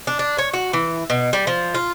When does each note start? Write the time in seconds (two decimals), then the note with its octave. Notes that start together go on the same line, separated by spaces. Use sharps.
0.07 D4
0.19 D4
0.38 C#5
0.53 F#4
0.73 E3
1.10 B2
1.33 G3
1.47 F3
1.75 F4